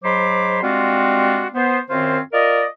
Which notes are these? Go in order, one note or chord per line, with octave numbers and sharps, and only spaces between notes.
G#2 F#3 C5 B5 C6 D6
G3 G#3 C4 D4 F4 F#4
B3 C5
F#2 D#3 C4 C#4 F4 C5
F4 A#4 D5 D#5